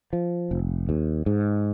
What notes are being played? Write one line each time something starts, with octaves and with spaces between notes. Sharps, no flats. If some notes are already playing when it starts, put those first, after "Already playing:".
F3
F1
D#2
G#2